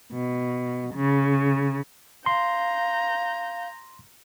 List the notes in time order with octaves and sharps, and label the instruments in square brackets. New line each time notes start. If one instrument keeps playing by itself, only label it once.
[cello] B2
C#3
[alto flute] F5 [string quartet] A#5 G6 [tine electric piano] C6